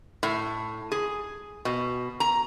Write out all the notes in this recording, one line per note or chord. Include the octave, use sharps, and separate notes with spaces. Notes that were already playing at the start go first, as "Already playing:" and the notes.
A2
G#4
B2
A#5